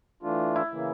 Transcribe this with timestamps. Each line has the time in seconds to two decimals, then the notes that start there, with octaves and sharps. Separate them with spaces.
0.23 E3 A3 D4 F4
0.56 E4
0.72 C#3 E3 A#3